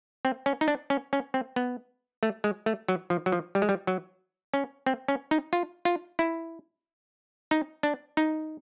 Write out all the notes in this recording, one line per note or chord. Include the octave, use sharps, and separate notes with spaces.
C4
C#4
D#4
D4
C#4
C#4
C4
B3
A3
G#3
A3
F#3
F3
F#3
F3
G3
G#3
G3
F#3
C#4
C4
C#4
D#4
F4
F4
E4
D#4
D4
D#4